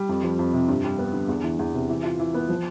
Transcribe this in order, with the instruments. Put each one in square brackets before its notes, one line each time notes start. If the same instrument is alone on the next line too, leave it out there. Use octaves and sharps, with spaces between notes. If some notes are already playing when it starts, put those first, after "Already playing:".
Already playing: [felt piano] G3
F2
F3
F2
C3
G2
G3
B3
D3
E2
E3
E2
C3
E3
F4
E3
B3
F3